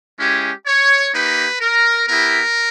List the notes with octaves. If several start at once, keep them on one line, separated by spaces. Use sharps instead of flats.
G#3 C#4 E4 G4
C#5
A#3 D#4 G4 B4
A#4
B3 E4 G4 A#4